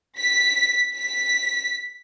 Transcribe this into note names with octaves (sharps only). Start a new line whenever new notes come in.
B6
B6